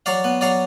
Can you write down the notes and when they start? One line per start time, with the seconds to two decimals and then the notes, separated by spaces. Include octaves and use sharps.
0.06 F#3 D5 F5
0.24 B3
0.41 F#3 D5 F5